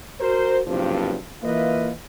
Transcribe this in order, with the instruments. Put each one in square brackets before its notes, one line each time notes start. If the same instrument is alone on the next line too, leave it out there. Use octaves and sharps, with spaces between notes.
[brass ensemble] F#4 A#4 C5
F#1 G2 C3 F3
E3 A#3 F4 B4 D#5 E5